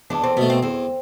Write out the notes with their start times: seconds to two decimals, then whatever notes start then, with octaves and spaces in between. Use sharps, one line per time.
0.10 E2 D4
0.24 C4
0.37 B2 A3 B3
0.50 C4
0.62 E2 C4